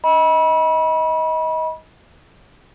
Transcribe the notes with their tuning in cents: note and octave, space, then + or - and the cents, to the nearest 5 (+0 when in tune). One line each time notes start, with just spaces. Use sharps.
D#5 +25 B5 -30